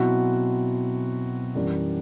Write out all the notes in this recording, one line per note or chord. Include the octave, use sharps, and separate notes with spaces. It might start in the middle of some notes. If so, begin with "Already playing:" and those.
Already playing: B2 F#3 C4 E4 F#4
F#2 E3 G3 D4